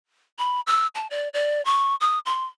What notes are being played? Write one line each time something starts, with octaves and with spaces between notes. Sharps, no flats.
B5
E6
A5
D5
D5
C#6
D#6
C6